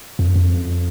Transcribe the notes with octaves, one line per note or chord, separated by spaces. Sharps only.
F2
F#2
F2